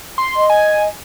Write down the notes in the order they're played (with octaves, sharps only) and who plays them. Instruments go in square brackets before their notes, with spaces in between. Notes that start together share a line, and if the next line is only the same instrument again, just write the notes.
[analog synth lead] C6
[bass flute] D#5
[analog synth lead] G#5